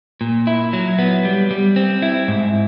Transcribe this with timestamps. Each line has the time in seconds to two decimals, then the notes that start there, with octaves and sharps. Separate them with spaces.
0.21 A#2
0.47 E4
0.73 F#3
0.99 B3
1.25 G3
1.51 G3
1.76 C4
2.02 E4
2.28 G#2